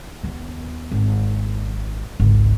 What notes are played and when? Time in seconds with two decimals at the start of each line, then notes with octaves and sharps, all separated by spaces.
0.23 D#2 B3
0.92 G#1
2.20 G#1 C#2